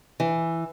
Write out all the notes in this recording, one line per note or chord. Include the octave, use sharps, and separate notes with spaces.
E3